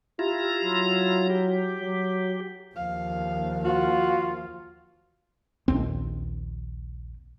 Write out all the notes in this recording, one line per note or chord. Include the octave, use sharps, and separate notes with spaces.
E4 F4 G4 A#5
F#3
G4
F#3
D#2 F3 F5
F4 F#4 F5
A#1 D#2 C4